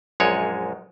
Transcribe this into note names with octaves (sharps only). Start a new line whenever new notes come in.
A#1 F#2 G#3 C#5